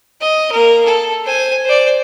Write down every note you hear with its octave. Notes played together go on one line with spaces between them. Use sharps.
D#5
A#3 A#4
A4
C5 G#5
C5 D5